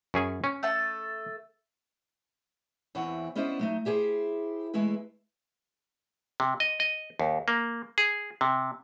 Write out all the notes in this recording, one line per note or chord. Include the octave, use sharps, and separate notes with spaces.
F#2 C#4 G#4
C#4
A3 A4 A5
E2 E3 C4 C#5 F#5
B3 C#4 D4 E4 C5 D#5
F#3 A3 D#4
E4 G4 G#4 B4 C5
E2 G#3 A3 E4 B4
C3
D#5
D#5
D#2
A#3
G#4
C3